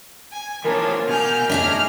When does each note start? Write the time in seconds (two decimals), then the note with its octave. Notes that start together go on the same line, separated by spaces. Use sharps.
0.32 G#5
0.64 E3 F3 A#3 D4 A#4 C#5
1.07 B2 G#5 F6 G6
1.50 A2 D4 D#4 G#4 E5 F6